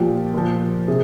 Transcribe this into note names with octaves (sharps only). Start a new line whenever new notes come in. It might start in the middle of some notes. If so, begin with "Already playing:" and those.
Already playing: A#2 F3 G4
A#2 F3
C3 G#4